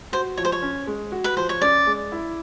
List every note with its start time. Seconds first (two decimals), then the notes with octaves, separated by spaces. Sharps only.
0.13 F#4 C5
0.37 F3 C#5
0.45 C5
0.52 C#5
0.62 C#4
0.87 G#3
1.12 F#4
1.24 B4
1.36 F3 C5
1.49 C#5
1.62 C#4 D5
1.87 G#3
2.12 E4